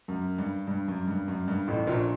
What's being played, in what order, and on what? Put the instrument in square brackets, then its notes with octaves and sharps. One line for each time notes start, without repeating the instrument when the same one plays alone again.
[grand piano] F#2
G2
G2
F#2
G2
F#2
G2
A1 A2
A#1 A#2